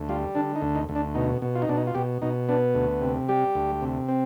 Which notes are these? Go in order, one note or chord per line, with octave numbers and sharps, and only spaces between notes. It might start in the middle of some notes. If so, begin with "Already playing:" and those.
Already playing: D2
G3 F4
D3 D4
D#4
D2
D#4
D2
D4
B2 D#4
B2
F4
D#4
B2 D4
D#4
F4
B2 G4
B2 D#4
B3 D4
D2
C3
G3 G4
D2
C3
C4